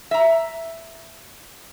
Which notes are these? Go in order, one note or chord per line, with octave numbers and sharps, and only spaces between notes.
E5 A#5